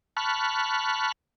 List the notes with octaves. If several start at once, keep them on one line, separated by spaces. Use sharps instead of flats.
A5 B5 C#6 F6 F#6